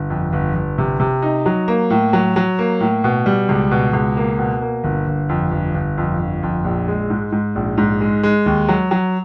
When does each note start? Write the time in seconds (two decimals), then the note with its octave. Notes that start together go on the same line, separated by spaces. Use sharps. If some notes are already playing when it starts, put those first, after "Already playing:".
Already playing: G1
0.10 F2
0.33 G1
0.55 G1
0.78 C3
1.00 C3
1.22 D#4
1.46 F#3
1.68 A#3
1.90 A2
2.13 F#3
2.36 F#3
2.59 A#3
2.80 A2
3.04 B2
3.26 G3
3.49 C#2
3.71 B2
3.93 C#2
4.17 A#3
4.39 B2
4.62 A#3
4.84 G1
5.07 G1
5.29 F2
5.51 G1
5.74 G1
5.98 F2
6.19 G1
6.43 F2
6.64 A#1
6.88 G#3
7.10 G#2
7.32 G#2
7.55 A#1
7.78 G#2
8.01 G#3
8.23 G#3
8.46 D#2
8.68 F#3
8.91 F#3